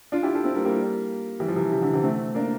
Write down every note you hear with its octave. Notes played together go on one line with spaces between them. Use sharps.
D4 F4
E4 G4
F4 A4
C4 E4
G3 A#3
G3 A#3
E3 G3
F3
C3 E3
C3
D3
C3 E3
A3 C4
A#3 D4